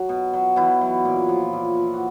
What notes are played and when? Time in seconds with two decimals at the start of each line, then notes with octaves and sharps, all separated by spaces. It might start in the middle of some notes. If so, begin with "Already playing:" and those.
Already playing: F#3 F#4
0.09 B2
0.33 F#3
0.56 B2 E3 E4
0.81 F#3
1.05 A#2
1.29 F3
1.53 A#2
1.77 F3
1.94 F#4